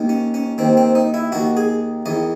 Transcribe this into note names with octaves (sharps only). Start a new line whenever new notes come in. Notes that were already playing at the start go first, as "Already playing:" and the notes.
Already playing: D#2 D#3
C#4
C#4
D#2 D#3 C4
C4
D#4
E4
D#2 D#3 F#4
G#4
E2 D#3 D#5